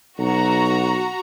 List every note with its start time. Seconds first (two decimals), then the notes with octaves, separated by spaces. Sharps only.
0.19 B1 F#4 A#5